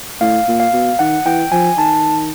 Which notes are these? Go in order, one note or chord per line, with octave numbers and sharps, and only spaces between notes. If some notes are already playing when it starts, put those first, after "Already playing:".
A2 F5
A#2
F5
B2
D#3 F#5
E3 G5
F3 G#5
D#3 A5